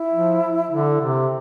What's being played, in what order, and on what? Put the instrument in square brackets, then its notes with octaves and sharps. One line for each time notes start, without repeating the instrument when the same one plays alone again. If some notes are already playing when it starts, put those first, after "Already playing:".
Already playing: [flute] E4
[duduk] F3
D3
C3